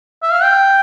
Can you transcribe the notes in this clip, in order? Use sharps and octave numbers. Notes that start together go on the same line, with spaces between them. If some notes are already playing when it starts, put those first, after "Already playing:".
E5
F5
G5